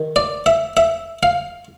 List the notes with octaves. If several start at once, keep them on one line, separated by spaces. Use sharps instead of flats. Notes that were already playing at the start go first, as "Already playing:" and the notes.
Already playing: D#3
D5
E5
E5
F5